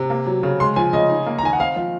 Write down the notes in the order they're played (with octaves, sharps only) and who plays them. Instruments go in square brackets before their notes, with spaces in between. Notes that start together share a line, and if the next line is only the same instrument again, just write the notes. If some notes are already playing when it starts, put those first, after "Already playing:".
Already playing: [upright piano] C3
A#3
F#3
C#3
[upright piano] G#3 [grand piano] C6
[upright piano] F3 [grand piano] G#5
[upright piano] C#3 [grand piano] D#5
[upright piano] D#4
A#3
[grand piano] A#5
[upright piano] D#3 [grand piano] G#5
[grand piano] F#5
[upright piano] C4 [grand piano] F5
[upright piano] F3 [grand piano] F5